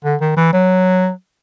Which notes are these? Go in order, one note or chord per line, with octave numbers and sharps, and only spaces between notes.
D3
D#3
E3
F#3